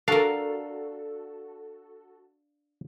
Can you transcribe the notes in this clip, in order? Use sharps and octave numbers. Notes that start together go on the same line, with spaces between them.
D4 F#4 A4 A#4 F5